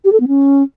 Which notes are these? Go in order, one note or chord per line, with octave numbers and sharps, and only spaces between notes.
G4
A4
B3
C#4